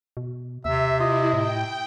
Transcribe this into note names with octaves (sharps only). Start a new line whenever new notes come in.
B2
D#2 C3 E5
E4 F4 D#5
A2 G5